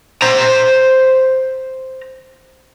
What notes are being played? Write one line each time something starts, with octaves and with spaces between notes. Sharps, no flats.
C5 A#5